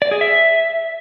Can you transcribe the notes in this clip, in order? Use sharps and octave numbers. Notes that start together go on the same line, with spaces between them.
D5
G#4
E5